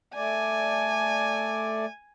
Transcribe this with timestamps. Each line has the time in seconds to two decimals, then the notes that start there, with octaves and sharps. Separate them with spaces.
0.15 A3 D5 G#5